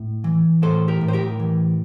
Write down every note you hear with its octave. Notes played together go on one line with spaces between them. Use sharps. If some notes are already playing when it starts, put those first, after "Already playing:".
Already playing: A2
E3
A2 A4 C5
G4 A#4
A2
C5
G4 A#4
E3